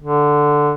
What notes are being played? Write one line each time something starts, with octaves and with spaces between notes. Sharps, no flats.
D3